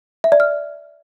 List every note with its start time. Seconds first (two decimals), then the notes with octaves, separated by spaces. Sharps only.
0.24 E5
0.32 D5
0.40 F6